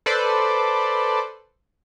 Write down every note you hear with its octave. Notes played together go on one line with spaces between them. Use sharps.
A4 B4 C5 D5